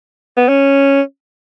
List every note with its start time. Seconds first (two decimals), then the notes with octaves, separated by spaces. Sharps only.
0.37 B3
0.48 C#4